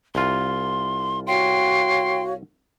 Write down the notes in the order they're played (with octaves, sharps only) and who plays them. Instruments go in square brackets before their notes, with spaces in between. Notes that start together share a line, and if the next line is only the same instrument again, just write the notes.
[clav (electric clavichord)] C2 F4 [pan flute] C6
[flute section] F#4 C#5 F5 [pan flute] G5 [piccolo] C6